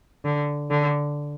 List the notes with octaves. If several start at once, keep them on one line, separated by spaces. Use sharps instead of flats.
D3
D3